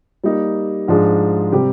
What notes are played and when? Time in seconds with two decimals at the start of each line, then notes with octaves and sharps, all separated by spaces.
0.24 G3 A#3 D#4
0.88 G#2 F3 G#3 D4 G#4
1.52 C3 G3 C4 G4